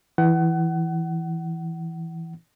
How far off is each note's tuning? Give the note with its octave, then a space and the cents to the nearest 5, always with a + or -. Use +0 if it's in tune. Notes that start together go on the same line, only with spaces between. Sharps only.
E3 +0 F#5 +30